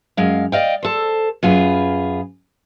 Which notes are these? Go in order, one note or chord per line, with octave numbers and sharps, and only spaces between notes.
F#2 G#3 F5
D5 D#5 F5 G5
A4 C5
F#2 F4 G#4 B4